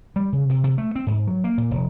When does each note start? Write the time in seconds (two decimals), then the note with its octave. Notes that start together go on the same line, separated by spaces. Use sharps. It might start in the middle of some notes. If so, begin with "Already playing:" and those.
0.16 G3
0.33 C#3
0.50 C3
0.64 C3
0.78 A3
0.96 C4
1.07 G#2
1.27 F#3
1.44 A#3
1.58 A#2
1.71 F1